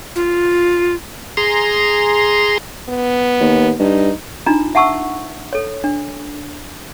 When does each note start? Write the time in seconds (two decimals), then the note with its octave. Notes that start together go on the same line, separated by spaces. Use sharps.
0.16 F4
1.37 G#4 A#5 C6
2.89 B3
3.40 D#2
3.80 G2 D#4
4.46 D4 D#4 F4 A#5
4.75 E5 F#5 A5 C#6 E6
5.53 A4 C#5
5.84 D4